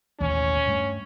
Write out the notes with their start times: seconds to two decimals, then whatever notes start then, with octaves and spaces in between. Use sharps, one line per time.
0.20 A1 D#2 B2 C#4
0.67 G2 A3